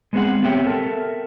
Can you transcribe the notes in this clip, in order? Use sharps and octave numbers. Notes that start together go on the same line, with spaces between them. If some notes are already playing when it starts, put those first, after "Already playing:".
G#3 B3 C4 G#4 F#5
B3 C4 G4 C#5 E5 G5
A4 A#4 E5